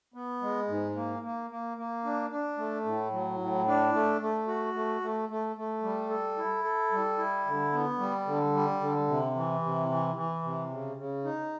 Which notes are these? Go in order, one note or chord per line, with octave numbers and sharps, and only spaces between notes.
B3
G#3
G#2
A#3
A#3
A#3
A#3
D4
D4
A3
A2
F#3
A2
D4
A3
A3
F#4
A3
A3
A3
A3
G3
A4
E4
A4
G3
E4
D3
B3
G3
D3
G3
D3
C3
E3
C3
E3
E3
C3
C#3
C#3
D#4